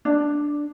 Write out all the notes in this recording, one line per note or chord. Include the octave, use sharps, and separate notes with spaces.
D4